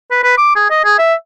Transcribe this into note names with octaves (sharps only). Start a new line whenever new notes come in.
B4
B4
D6
G#4
D#5
G#4
E5